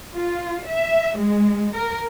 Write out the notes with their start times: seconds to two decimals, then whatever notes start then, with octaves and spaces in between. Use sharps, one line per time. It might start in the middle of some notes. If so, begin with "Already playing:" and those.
0.13 F4
0.66 E5
1.19 G#3
1.76 A#4